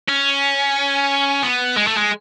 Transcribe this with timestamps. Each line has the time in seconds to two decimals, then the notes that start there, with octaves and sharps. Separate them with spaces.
0.09 C#4
1.43 B3
1.77 G#3
1.87 A3
1.97 G#3